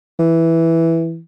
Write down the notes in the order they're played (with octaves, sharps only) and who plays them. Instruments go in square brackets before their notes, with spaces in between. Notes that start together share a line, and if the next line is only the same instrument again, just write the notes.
[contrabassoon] E3